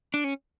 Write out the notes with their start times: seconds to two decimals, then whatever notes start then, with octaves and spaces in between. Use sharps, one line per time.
0.14 D4
0.24 C#4